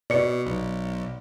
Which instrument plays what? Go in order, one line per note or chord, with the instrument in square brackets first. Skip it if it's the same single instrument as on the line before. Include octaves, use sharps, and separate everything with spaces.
[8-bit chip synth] B2 [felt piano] D5 C#7
[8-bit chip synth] B1